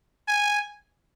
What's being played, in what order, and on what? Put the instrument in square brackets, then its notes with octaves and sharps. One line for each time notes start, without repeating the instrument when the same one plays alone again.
[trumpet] G#5